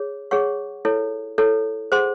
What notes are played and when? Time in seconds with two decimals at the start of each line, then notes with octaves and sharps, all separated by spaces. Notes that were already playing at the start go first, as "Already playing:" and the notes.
Already playing: G#4 C#5
0.31 G#4 C#5 F#5 C#6
0.85 E4 A4 C#5
1.38 E4 A4 C#5
1.92 G#4 C5 F#5 C6